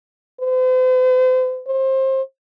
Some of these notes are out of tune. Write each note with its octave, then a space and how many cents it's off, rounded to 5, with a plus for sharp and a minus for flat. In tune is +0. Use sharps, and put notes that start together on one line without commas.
C5 -40
C5 +25